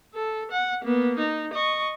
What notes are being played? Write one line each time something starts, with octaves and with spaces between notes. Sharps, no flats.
A4
F#5
A#3 B3
D#4
D#5 C#6